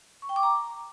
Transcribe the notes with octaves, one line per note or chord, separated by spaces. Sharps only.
C#6
G5
D6
A#5